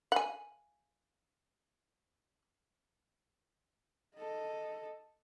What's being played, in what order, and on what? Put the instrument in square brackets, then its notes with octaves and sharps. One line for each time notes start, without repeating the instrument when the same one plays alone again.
[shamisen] F#5 G#5
[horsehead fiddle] A4 D#5